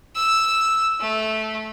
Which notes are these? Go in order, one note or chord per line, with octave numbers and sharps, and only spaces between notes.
E6
A3